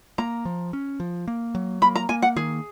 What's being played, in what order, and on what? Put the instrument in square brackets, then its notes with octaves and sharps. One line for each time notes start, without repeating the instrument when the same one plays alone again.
[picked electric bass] A#3 [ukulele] A#5
[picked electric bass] F3
C#4
F3
A#3
F#3
[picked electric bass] A#3 [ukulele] B5
[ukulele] A#5
[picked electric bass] A#3 [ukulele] G#5
[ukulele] F#5
[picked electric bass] D#3 [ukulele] G#4